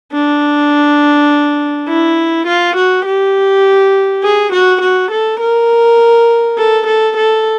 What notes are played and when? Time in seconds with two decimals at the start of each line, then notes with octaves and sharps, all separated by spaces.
0.13 D4
1.89 E4
2.48 F4
2.76 F#4
3.06 G4
4.23 G#4
4.52 F#4
4.81 F#4
5.11 A4
5.40 A#4
6.58 A4
6.87 A4
7.17 A4